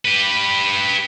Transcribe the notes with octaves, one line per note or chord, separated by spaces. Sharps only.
G4 B4